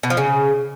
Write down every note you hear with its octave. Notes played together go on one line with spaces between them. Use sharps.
B2
F3
C#3